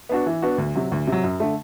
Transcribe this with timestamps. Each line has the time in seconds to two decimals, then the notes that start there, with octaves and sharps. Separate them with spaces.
0.09 B3 D4 F#4
0.26 E3
0.42 B3 D4 F#4
0.58 D2
0.75 C3 F#3
0.92 D2
1.07 C3 F#3
1.23 F#2
1.40 D3 A3